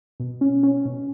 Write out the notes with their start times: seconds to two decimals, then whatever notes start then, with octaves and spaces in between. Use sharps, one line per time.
0.20 B2
0.41 C#4
0.63 C#4
0.85 B2